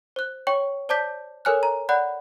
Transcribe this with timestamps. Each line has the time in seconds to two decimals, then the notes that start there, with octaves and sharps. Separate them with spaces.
0.16 C5 F#6
0.47 C#5 G5 C#6
0.89 C5 D5 A5 D6 G6 B6
1.45 A4 A#4 C#5 G#5 F6 F#6
1.63 A#5
1.89 D5 F#5 B5 F#6